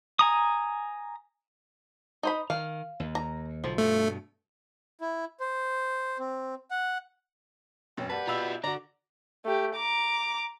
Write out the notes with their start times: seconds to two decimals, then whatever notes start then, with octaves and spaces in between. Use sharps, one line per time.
0.19 G#5 A#5 D#6
2.23 D#4 C5 B5
2.50 D#3 F5
3.00 D#2
3.15 A#5
3.64 B1 D3 F3
3.78 G2 B2 A3
5.01 E4
5.40 C5
6.19 C4
6.71 F#5
7.97 E1 F#2 B4 C#5 G5
8.10 G4 B4 D5 F#5 A5
8.27 B2 F4 E5 B5 E6
8.64 D3 F#4 D5 A#5
9.45 A3 G4
9.75 A#5 D6